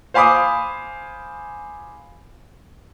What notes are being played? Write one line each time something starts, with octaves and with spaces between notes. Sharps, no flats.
C5 F5 G#5 B5 D6 D#6